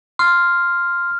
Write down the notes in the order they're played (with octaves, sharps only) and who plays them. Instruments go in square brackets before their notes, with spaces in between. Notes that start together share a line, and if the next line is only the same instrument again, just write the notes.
[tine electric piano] C6 [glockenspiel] F6